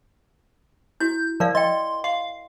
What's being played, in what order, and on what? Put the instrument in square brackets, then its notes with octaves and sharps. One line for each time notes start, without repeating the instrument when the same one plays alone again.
[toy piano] E4 F#4 [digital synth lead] G6
[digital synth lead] F3 [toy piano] A#4 D5 F5
[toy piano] D#5 G5 [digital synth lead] C6
[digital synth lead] F5 [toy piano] C6